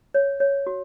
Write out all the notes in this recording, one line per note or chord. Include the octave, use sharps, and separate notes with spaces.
C#5
C#5
F#4